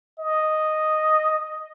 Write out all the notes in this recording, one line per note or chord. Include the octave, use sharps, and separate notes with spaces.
D#5